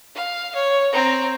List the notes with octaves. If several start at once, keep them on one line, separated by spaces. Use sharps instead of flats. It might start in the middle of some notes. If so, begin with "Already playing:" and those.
F5
C#5
C4 A#5